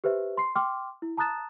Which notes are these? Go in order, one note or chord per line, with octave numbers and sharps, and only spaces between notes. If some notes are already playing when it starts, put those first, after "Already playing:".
G4 B4 C5 E5
C6 C7
G5 C6 D6 F6
E4
A5 A#5 D#6 F#6 A6 E7